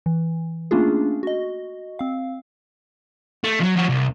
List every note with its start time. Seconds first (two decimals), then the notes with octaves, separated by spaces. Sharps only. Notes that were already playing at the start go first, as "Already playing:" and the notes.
0.06 E3
0.71 A3 A#3 C#4 D4 F4 G#4
1.23 F#4 D#5
1.99 C4 F5
3.44 A3
3.60 F3 F#3
3.76 F3 F#4
3.89 C2